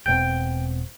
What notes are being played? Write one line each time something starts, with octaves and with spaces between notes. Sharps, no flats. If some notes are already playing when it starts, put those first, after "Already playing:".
E1 B2 C4 G5